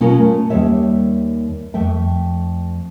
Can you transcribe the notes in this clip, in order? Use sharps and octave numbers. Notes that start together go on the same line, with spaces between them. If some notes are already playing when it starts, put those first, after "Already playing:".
B2 C#4 F4 A#4
A3
D#2 G3 C#5 E5
F2 A3 E5 G5